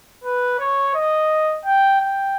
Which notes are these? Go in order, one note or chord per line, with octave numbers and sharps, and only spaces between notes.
B4
C#5
D#5
G5
G5